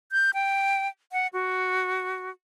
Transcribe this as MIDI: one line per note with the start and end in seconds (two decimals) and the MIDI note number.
0.12 0.31 91
0.34 0.88 79
1.12 1.27 78
1.33 2.30 66